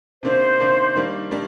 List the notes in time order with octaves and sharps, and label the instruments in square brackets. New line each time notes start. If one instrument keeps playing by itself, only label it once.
[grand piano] C3 D#3 A#3 D4 [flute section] C5
[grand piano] C3 D#3 A#3 D4
D#3 G3 A#3 D4
D#3 G3 A#3 D4